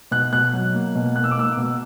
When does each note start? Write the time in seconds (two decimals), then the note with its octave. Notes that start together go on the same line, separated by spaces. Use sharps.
0.11 B2 F#6
0.32 B2 F#6
0.53 F#3
0.74 A#3
0.95 B2
1.16 A#3 F#6
1.24 E6
1.31 D6
1.37 A#3 E6
1.57 B2